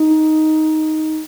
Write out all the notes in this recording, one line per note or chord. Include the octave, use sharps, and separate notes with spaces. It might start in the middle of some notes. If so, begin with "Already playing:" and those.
Already playing: D#4